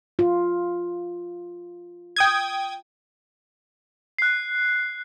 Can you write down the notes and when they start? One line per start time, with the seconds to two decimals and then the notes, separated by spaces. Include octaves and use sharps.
0.19 F4
2.16 G5 D#6 G#6
4.19 F#6 C7